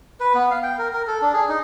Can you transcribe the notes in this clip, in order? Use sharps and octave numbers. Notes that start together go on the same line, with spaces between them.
B4
B3
F5
G5
A#4
A#4
A4
D4
G#4
D#4